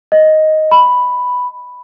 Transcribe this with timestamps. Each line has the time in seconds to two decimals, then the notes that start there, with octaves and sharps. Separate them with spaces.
0.12 D#5
0.71 B5